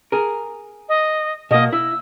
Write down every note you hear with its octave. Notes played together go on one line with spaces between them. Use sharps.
G#4 A#4
D#5
B2 A#3 D#5
E4 E6